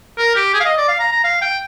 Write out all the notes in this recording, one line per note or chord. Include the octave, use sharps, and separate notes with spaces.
A#4
G4
G#4
F5
D#5
D5
F5
A#5
A#5
F5
G5